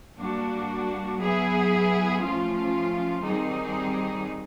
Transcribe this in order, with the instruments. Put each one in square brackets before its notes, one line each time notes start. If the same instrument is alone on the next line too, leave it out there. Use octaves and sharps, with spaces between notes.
[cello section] G3 A#3 D4 F#4
F#3 B3 E4 G#4
F3 A3 C#4 F4
D#3 G3 C4 D#4 G#4